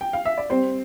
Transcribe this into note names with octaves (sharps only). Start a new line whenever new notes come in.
G5
F5
E5
D5
G3 C4 C5